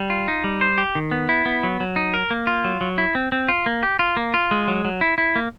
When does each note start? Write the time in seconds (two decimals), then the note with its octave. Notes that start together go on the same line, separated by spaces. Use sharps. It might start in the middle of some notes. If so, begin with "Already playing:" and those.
Already playing: G3
0.10 F4
0.28 D#4
0.44 G3
0.61 C5
0.78 G4
0.95 D#3
1.11 B3
1.29 E4
1.46 B3
1.63 F#3
1.80 F#3
1.96 D#4
2.14 A#4
2.31 A#3
2.47 F4
2.64 F#3
2.81 F#3
2.98 E4
3.15 C4
3.32 C4
3.48 F4
3.66 A#3
3.83 G4
3.99 F4
4.17 A#3
4.34 F4
4.51 G#3
4.68 F#3
4.85 F#3
5.01 E4
5.18 E4
5.36 A#3